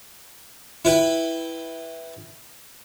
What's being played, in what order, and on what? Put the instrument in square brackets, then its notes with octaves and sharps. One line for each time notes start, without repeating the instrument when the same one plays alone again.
[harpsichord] E4 B4 G5